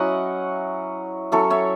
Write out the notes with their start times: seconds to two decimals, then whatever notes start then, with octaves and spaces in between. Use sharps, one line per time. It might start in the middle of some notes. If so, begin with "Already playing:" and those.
Already playing: F#3 C#4 E4 D#5 F#5
1.32 F#3 C#4 E4 A4 C#5
1.50 C#5 E5